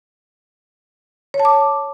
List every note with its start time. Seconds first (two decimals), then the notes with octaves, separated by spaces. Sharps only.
1.34 C#5
1.40 A5
1.45 D6